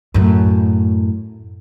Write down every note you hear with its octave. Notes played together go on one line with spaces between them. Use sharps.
F#2 A2